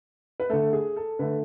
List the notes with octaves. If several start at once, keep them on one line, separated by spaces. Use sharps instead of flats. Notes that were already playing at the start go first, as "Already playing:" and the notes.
B4
D3 A3 A4
G#4
A4
D3 A3 B4